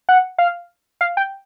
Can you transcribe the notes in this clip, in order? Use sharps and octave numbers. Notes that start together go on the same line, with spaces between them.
F#5
F5
F5
G5